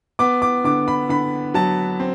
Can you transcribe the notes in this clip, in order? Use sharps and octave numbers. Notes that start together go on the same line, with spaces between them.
B3 D6
D6
D3 D6
B5
D3 B5
F#3 A5
C4